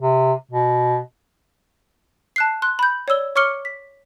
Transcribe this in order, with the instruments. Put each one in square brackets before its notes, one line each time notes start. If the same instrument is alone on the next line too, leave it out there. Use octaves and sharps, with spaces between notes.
[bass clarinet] C3
B2
[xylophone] A5 F#6 C7
C6 F#6
B5 G6
C#5 D5 E6 G7
C#5 C#6 D6 F6 C#7 G7
B6